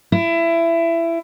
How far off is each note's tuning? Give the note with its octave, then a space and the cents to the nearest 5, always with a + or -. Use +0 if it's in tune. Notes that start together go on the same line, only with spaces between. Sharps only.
E4 +20